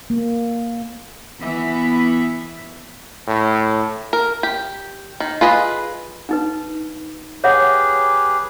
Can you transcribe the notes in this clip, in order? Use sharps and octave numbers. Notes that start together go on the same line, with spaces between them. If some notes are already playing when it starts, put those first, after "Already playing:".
A#3
E3 B3 E5
A2
A#4
G4
D#3
F4 G#4 B4 D#5 G#5
D4 D#4 B4
G4 G#4 B4 C#5 E5 F#5